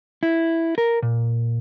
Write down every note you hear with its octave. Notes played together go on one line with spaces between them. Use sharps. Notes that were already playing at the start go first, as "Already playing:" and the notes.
E4
A#4
A#2